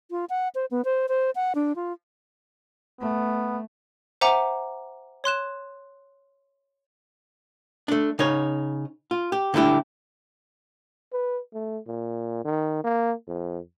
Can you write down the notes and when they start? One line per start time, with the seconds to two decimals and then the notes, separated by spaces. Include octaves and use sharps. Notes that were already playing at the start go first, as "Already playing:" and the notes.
0.11 F4
0.30 F#5
0.55 C5
0.71 B3
0.85 C5
1.09 C5
1.35 F#5
1.55 D4
1.76 F4
3.01 A3 B3
4.21 C5 E5 F#5 G#5 A#5 D6
5.24 C#5 C6 F#6 E7
7.88 A3 D4
8.19 C#3 D#4 C#5
9.11 F4
9.32 G4
9.54 D3 A3 D4 E4 G4
11.13 B4
11.54 A3
11.87 A#2
12.45 D#3
12.84 A#3
13.27 F2